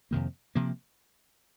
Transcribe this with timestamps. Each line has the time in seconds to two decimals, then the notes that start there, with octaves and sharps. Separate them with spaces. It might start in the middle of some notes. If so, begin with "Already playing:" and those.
0.11 F2 C3 D#3 A#3
0.55 C3 F3 A#3